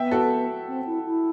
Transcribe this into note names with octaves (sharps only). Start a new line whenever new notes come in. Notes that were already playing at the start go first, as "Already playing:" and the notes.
Already playing: B3 E5 G5
F#4 A4
C4
E4
E4